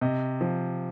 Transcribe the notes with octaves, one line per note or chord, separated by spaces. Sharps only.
C3 D#5
F3